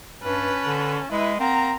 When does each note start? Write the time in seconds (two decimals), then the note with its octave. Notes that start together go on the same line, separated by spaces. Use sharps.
0.23 G2 C#4 B4 A5
0.65 D3
1.11 G#3 E4 B4 E5
1.40 A#3 C4 F#5 A#5